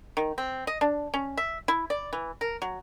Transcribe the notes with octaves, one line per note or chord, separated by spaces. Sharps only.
D#3
C4
D#5
D4
C#4
E5
E4
D5
E3
A#4
F#3